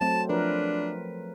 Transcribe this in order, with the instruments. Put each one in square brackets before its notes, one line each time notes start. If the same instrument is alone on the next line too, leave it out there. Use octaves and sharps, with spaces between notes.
[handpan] F#3 A3 C4 [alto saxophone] A5
[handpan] F3 A#4 B4 [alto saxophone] D4